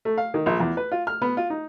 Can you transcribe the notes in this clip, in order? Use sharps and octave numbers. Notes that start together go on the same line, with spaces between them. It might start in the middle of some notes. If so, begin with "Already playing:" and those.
A3
F5
D#3
A#1
E2
B4
F4
F6
B3
F4
D#4